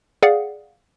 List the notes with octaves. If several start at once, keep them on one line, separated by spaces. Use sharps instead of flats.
G#4 D5 F5 F#5